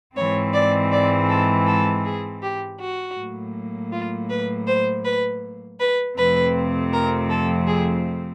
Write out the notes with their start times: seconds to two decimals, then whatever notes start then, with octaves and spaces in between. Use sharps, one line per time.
0.16 G#2 E3 G#3 C4 C#5
0.54 D5
0.92 D5
1.29 A4
1.67 A4
2.04 G#4
2.42 G4
2.80 F#4
3.17 A2 F#3 A#3
3.92 F4
4.30 B4
4.67 C5
5.05 B4
5.80 B4
6.17 F2 C3 F3 A3 C4 B4
6.92 A#4
7.30 A4
7.67 G#4